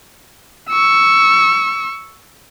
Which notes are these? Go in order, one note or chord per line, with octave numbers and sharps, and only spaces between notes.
C#6 E6